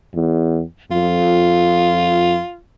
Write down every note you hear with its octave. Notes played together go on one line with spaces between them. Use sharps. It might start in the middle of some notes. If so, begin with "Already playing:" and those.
E2
F2 F4